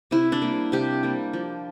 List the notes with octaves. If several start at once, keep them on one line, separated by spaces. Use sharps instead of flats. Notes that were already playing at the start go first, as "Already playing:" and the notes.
C3 E4
D4
G3 A#3
C3 G4
G3 A#3
F3